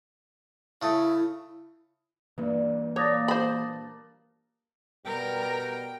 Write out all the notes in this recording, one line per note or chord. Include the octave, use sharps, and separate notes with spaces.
C#3 A3 E4
G2 E3 A#3
A#2 C#5 A5 D6 D#6 A#6
C5 B5
B2 G3 B3 A#4 G5